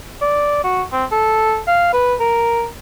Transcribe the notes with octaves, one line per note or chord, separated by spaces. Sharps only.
D5
F#4
C4
A4
F5
B4
A#4